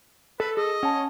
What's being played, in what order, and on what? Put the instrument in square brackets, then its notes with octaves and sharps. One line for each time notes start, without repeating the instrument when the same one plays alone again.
[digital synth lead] A4 [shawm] B4
[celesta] G#4 [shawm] D#5
[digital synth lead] C#4 [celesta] F#5 A5